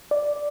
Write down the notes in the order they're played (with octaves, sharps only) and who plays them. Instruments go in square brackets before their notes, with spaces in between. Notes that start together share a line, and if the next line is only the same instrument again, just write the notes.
[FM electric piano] D5